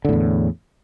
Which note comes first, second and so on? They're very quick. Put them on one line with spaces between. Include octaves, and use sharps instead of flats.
D3 A2 E2